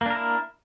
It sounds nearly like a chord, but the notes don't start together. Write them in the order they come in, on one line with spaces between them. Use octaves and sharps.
A#3 D4 A#4 E4